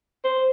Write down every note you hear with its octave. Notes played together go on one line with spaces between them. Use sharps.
C5